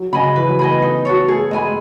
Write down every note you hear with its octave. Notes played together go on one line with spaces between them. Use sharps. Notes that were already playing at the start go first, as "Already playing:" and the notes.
Already playing: F#3
C#3 D#5 G#5 B5
E3 B4
F#3
A3 D#5 G#5 B5
B3
D#4
F#4 A4 C#5
A3 G#4
G#3 D#5 G#5 B5